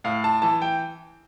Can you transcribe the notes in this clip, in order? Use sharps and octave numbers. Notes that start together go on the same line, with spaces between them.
A2 F5
A5
E3 A5
G5